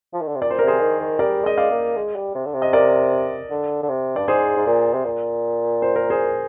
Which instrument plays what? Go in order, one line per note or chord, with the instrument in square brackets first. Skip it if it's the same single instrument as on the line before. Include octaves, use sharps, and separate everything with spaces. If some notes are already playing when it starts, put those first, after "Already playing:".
[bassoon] F3
D#3
D3
C3
[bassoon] A#2 [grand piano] D5
[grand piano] C5
[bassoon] C3 [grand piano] A#4
[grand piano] G#4 C5
[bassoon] D#3
D#3
[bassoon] G3 [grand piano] A#4 D5
[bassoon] G#3 [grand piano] D#5
[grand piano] D5 F5
[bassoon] A#3
G#3
G3
C3
D3
C3
[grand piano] D#5
A#4 D5
[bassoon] D3
D3
C3
[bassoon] G2 [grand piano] D5
[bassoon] G#2 [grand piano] G#4 C5
[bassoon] G#2
A#2
C3
A#2
[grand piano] C5
A#4
G#4 C5